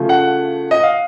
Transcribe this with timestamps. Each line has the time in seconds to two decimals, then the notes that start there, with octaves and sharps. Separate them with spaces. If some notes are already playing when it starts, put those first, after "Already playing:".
Already playing: C#3 F3 A3
0.09 F#5
0.71 D#5
0.83 F5